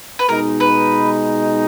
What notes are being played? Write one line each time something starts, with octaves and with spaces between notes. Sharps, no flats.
B4
B2 G#3 D#4 A#4
B4